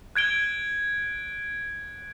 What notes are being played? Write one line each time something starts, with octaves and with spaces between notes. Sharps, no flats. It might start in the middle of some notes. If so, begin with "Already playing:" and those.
F#6 G#6 D7 G7